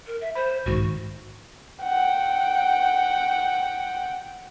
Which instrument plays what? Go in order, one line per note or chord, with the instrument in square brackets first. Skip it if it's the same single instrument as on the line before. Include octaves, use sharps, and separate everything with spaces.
[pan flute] A#4
E5
[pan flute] C5 [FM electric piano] B5
[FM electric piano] B1 G#2 D#3 [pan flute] F#4
[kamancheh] F#5 G5